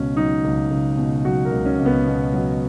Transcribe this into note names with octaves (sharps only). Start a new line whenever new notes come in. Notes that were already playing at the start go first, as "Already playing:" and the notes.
Already playing: C#2 B2 C#4
F#3 D#4
C#2
C#2
B2
F#3 F#4
A#4
C#2
C#4
C#2
B3
B2
F#3